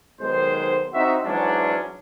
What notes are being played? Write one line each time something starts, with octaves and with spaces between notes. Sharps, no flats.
B1 D#3 G#3 C5
C4 D#4 F#4 E5
G#2 E3 F#3 G#3 C#4 D4